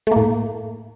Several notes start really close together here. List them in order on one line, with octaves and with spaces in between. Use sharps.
A3 A#3 A2